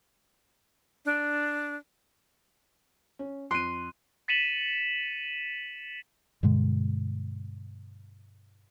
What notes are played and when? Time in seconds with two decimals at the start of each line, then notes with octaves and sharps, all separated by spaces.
1.05 D4
3.19 C#4
3.51 F2 C6 F#6 D7 D#7
4.28 A6 B6 C#7 D#7 E7 F#7
6.43 G2 B2 D3 G#3